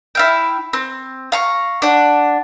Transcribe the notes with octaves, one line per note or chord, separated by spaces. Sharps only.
E4 F5 G5
C4
F5 A#5 C#6
D4 F#5